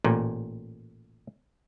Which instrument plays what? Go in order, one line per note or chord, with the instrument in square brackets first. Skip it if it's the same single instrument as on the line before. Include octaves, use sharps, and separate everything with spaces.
[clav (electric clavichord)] A1 A#2